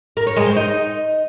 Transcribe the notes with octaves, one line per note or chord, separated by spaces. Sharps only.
A#4
C#5
G#3
C5
D#4